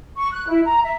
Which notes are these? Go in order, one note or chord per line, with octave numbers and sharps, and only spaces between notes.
C#6
F#6
E4
A#5
E5